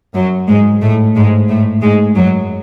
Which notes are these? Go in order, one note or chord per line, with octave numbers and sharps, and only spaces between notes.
F#2 F#3
G#2 G#3
A2 A3
G#2 G#3
A2 A3
G#2 G#3
F#2 F#3